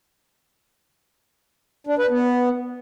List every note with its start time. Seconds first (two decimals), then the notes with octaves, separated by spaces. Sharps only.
1.87 D4
1.99 B4
2.10 B3